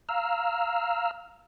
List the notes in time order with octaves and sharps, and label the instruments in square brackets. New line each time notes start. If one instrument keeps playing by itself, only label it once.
[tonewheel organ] F5 A#5 E6 F6